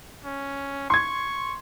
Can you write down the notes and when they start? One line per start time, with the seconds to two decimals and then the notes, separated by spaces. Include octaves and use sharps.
0.24 C#4
0.90 C6 C#6 G#6